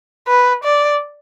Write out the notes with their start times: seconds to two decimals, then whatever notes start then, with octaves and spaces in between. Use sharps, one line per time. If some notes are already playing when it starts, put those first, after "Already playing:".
0.28 B4
0.64 D5